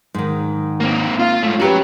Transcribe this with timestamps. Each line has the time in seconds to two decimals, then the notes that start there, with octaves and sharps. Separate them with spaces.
0.14 G#2 D#3
0.80 A#3 C4
1.19 F4
1.43 G#2 A3
1.60 C#4 F#4 G4 B4 A#5